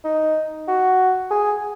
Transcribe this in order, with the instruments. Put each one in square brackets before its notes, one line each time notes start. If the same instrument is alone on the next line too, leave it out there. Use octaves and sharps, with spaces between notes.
[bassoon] D#4
F#4
G#4